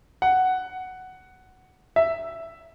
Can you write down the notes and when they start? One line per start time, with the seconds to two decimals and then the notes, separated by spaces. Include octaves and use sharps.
0.22 F#5
1.96 E5